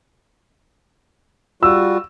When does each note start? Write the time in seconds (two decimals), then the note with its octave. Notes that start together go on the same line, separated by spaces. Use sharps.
1.63 G3 F4 F#4 E6